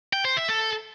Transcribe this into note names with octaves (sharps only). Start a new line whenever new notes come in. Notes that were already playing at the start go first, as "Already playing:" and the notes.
G5
C5
E5
A4